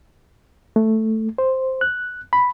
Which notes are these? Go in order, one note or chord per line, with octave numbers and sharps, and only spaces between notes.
A3
C5
F#6
B5